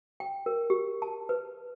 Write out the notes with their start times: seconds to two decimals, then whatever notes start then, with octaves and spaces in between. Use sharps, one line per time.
0.20 G5
0.46 A#4
0.70 G4
1.02 A5
1.29 B4